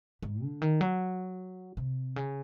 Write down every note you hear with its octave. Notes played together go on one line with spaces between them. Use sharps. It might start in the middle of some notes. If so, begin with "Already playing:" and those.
G#2
D3
D#3
F#3
C3
C#3